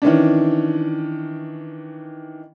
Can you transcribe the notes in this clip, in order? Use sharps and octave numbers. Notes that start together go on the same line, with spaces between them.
D#3 E3 C#4 D4